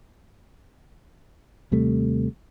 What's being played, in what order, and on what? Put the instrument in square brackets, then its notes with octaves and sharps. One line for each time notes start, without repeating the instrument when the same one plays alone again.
[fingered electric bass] D#2 C3 G3 A3